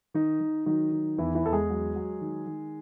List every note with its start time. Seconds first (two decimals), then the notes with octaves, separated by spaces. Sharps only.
0.14 D#3 D#4
0.40 D#3
0.66 D#3 F#3 D#4
0.92 D#3
1.18 E2 E3 E4
1.35 E3 E4
1.44 E2 A4
1.53 G#3 G#4
1.70 F#3
1.96 F#3
2.21 D#3
2.47 D#3